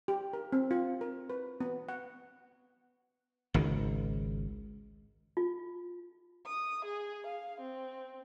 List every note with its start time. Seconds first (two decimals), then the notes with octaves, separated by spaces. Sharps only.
0.08 G4
0.33 A#4
0.52 C4
0.71 F4
1.01 A#4
1.30 B4
1.60 B3
1.89 F#5
3.54 G#1 C#2 D#3
5.37 F4
6.46 D#6
6.85 G#4
7.26 F5
7.60 C4